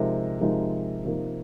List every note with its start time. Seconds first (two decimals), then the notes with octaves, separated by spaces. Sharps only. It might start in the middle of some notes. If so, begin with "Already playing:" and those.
Already playing: C3 F3 G#3 D#4 A#4
0.40 C3 F3 G#3 D#4 A#4
1.05 C3 F3 A#3 D#4